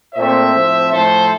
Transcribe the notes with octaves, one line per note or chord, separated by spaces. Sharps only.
A#2 A3 C4 C5 E5
A2 F3 C4
A2 F3 A3 A4 C5